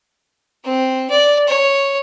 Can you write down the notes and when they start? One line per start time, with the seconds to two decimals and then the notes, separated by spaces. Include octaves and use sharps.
0.65 C4
1.10 D5
1.48 C#5